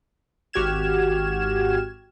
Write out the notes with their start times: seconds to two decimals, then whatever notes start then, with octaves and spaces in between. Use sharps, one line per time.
0.53 G#1 F#4 G4 F6 G#6 E7